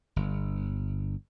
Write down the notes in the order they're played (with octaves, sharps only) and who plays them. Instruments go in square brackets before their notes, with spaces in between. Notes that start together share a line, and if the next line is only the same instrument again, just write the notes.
[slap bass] G1